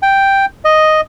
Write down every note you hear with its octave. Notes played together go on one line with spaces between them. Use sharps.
G5
D#5